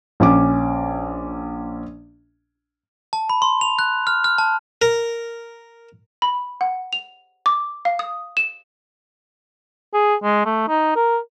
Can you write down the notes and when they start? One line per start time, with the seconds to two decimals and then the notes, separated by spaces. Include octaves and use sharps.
0.20 A#1 C#4 D6
3.13 A5
3.30 B5
3.42 C6
3.61 F7
3.79 F#6
4.07 F6
4.24 F6
4.38 A5
4.82 A#4
6.22 B5
6.61 F#5
6.93 F7
7.46 D6
7.85 F5
7.99 D#6
8.37 E7
9.94 G#4
10.23 G#3
10.45 A3
10.68 D#4
10.96 A#4